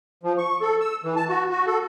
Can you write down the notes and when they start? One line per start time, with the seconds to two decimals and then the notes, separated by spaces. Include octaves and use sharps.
0.23 F3
0.38 C#6
0.61 A4
0.80 E6
1.04 E3
1.16 A5
1.29 F#4
1.50 F#4
1.66 A4